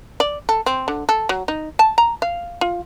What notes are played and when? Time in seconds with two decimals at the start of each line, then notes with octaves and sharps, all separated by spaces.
0.20 D5
0.49 A4
0.66 C4
0.88 D3
1.09 A4
1.29 F#3
1.48 D#4
1.79 A5
1.98 A#5
2.22 F5
2.61 F4